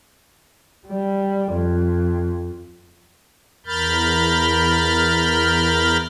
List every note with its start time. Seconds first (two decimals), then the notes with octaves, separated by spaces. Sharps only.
0.88 G3
1.53 F2
3.66 E2 A#4 B5 F6 G6 A6